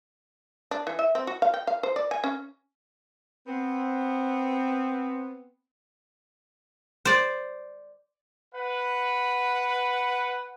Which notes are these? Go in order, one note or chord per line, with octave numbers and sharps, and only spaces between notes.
D4
E3
E5
C4
F#4
F5
G5
F5
C5
D5
G#5
C#4
B3 C4
C5 D5
B4 F#5